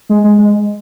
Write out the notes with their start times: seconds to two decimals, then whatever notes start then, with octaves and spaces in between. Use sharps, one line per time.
0.09 G#3
0.24 G#3
0.38 G#3